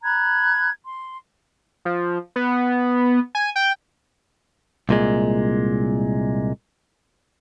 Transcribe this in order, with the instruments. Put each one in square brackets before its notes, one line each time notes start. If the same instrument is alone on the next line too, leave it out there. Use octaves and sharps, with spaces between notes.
[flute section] A#5 B5 F#6 G#6
C6
[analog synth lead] F3
B3
G#5
G5
[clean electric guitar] C2 A#2 G#3